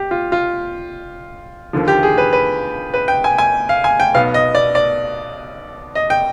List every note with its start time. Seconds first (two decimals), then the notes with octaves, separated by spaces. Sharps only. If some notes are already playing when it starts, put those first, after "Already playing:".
Already playing: G4
0.11 F4
0.32 F4
1.73 D#2 D3 F3
1.88 G4
2.03 G#4
2.18 B4
2.33 B4
2.94 B4
3.08 G5
3.24 G#5
3.38 G#5
3.69 F5
3.84 G#5
4.00 G5
4.14 B1 B2 B3 F5
4.34 D#5
4.55 D5
4.75 D5
5.95 D#5
6.10 G5